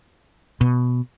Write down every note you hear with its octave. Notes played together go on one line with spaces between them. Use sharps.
B2